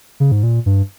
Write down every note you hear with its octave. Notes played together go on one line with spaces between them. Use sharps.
C#3
G#2
A#2
G2